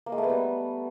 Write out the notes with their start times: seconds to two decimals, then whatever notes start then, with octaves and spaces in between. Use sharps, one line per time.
0.06 A#3
0.12 G#3
0.18 A3
0.24 B3
0.30 G3